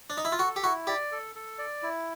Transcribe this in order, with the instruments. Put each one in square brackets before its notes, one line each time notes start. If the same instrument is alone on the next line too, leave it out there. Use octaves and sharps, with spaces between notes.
[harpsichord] D4
D#4
E4
F4
[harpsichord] F#4 [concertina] A4
[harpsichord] G4
[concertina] E4 [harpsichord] F#4
[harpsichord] G4 [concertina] D5
[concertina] A4
A4
D5
E4